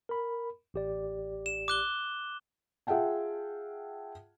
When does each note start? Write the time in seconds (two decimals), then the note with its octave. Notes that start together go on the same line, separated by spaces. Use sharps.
0.09 A#4 B5
0.74 A1 G4 D5
1.46 E7
1.68 D6 F#6 G7
2.87 F4 G#4 E5 F#5 G5 A5